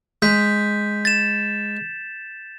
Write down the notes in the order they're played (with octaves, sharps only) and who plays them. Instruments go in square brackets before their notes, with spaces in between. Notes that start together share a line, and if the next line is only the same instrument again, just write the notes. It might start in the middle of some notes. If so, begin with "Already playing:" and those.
[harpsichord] G#3 [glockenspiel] G6 B6
[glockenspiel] A6 E7